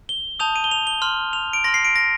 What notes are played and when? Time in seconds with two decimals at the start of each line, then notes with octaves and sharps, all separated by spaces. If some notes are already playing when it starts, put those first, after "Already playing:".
0.09 G7
0.40 A5 D#6 G6 F7
0.56 D#7
0.64 G7
0.71 F7
0.87 G7
1.02 C6 F6
1.33 F7
1.53 D7
1.64 C6 F6 A#6
1.74 C7
1.85 D7
1.96 A#6